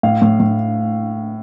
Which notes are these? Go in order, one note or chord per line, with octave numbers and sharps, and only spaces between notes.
A2 F5
A2
A2